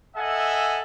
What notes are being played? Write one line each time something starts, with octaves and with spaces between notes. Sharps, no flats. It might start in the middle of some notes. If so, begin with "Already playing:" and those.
A4 D#5 E5 F#5 G#5